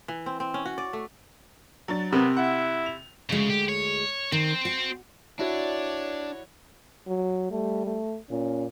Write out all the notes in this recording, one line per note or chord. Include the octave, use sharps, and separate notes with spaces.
E3
C4
C4
C#4
F#4
D5
A3
F#3 D4 A6
C3 B3 C4 A#4
E4 F#5
F7
D2 C#3 G#3
G4
C#5
D#3 C4
F#4
D4 E4 F#4 C#5 D5
F#3
G3 A3
A3
A#2 C#4